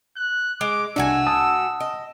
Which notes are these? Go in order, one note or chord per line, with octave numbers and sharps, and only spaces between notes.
F#6
G#3 D6
C2 A3 D4 F#4 G#5 E6
F#5 A5 D#6
D#5